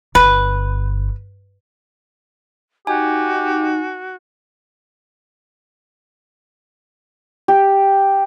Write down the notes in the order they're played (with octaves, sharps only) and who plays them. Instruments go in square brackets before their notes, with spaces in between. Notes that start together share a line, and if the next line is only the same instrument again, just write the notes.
[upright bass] G1 [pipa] B4
[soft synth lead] D#4 [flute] F#4 [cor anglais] G4 [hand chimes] G#5
[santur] G4